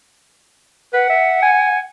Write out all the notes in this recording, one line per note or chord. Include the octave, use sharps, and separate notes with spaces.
B4 F#5
E5
G#5